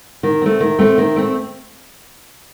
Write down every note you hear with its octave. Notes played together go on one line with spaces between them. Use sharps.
D#3
A3 C4
D#3
A3 C4
D#3
A3 C4